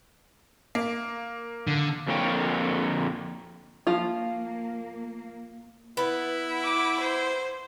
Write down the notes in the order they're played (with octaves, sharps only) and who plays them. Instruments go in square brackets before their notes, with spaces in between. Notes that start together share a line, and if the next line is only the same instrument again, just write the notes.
[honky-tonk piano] A#3
[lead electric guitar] D3
[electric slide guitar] F2 D3 A#3 C#5 G5
[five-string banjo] F3 F4 [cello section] A#3
[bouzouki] B3 [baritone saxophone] E4
[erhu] D6
C5